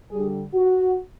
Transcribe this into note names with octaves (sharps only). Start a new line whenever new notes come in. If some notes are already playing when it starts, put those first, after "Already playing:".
G3 G#4
D3
F#4